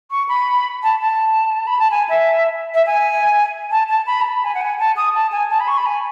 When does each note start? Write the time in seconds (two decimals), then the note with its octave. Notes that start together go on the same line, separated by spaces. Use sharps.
0.11 C#6
0.29 B5
0.83 A5
1.01 A5
1.67 B5
1.79 A5
1.91 G#5
2.09 E5
2.74 E5
2.86 G#5
3.71 A5
3.89 A5
4.06 B5
4.21 A5
4.25 B5
4.43 G#5
4.55 F#5
4.61 G#5
4.79 A5
4.97 D#6
5.14 A5
5.32 G#5
5.50 A5
5.60 B5
5.68 C#6
5.78 B5
5.86 G#5